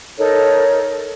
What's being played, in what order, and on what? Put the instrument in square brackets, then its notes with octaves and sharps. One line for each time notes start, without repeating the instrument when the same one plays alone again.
[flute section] D#4 A4 A#4 C#5